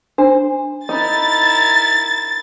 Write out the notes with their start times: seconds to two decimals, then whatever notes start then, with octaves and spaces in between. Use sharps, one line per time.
0.18 D4 C5
0.89 D#4 E4 A#4 A6